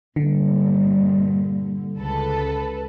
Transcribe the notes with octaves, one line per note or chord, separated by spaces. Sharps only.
G2 A#2 D3
C#2 A4 B4